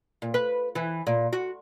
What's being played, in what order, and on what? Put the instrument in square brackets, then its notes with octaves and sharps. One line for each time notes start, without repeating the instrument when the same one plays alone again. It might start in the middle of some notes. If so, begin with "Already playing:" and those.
[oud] A#2
B4
E3
A#2
F#4